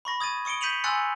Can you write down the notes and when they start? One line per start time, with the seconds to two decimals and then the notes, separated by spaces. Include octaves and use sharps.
0.05 B5 C#6 A#6
0.21 D#6 G#6 A6 D#7
0.45 C#6 D#6 C#7 D7 G7
0.61 G6 B6 C#7 D#7 F7 F#7
0.84 G#5 C6 E6 F#6 A6 C#7